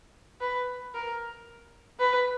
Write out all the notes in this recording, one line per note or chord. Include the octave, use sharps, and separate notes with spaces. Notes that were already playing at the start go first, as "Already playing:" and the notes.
B4
A#4
B4